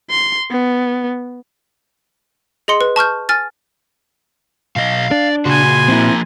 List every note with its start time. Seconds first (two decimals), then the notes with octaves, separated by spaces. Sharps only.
0.10 C6
0.51 B3
2.68 G#4 D#5 C6 C#7
2.81 B4
2.96 A5 C#6 F6 G6
3.29 G#5 F6 A6
4.76 B1 D#5 F5
5.11 D4 D5
5.45 A#2 C#3 F#4 G#5 C6
5.88 F3 A#3 C4 E4